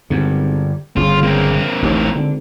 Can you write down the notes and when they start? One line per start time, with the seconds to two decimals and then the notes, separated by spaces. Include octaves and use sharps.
0.10 G#1 G2 D3
0.97 G1 C#3 F4
1.23 A#3 C4
1.82 A1 D#2 A2
2.15 G#1 D3